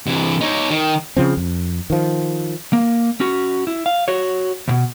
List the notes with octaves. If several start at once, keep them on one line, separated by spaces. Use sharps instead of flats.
C3 E3
D#4 C#5
D#3
C#3 F3 C4
F2
D#3 F3
A#3
C#4 F#4
E4
F5
F#4 C#5
D2 B2